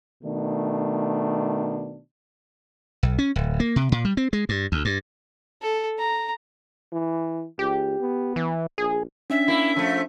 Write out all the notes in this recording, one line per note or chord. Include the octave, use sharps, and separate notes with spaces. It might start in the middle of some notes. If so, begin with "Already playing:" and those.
B2 D#3 A3 D4
B1
C#4
D1
A#3
C3
A#2
G3
C4
G#3
G2
D2
G2
A4
A#5
E3
C#2 G4
B3
E3
A#1 G#4
C#4 D4 E5
A#3 E4
F3 A3